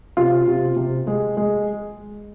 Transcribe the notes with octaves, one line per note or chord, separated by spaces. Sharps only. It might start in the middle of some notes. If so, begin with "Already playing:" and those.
C3 F4
C3
C3
G#3
G#3